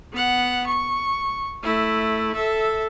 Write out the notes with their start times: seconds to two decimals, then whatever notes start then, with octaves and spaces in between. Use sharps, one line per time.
0.13 B3 F#5
0.67 C#6
1.63 A3 E4
2.35 A4 E5